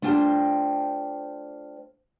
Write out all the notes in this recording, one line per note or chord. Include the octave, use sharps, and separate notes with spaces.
A3 D4 F4 C5 G5 A5